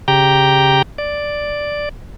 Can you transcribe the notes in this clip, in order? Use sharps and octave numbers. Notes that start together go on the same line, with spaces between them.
C#3 G4 G5 A#5
D5